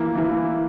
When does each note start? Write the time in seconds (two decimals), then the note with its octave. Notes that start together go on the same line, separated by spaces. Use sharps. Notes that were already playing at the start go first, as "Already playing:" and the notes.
Already playing: E3 A#3 E4
0.15 E3 A#3 E4